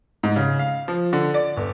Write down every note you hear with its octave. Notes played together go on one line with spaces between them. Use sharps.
G#2
C#3
F5
F3
D3
D5
G1